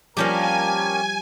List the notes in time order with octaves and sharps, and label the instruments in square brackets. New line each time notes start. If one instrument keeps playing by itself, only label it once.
[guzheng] F3 G3 [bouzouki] A#3 C#4 G4 [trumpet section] A#4 A5 [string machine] G#5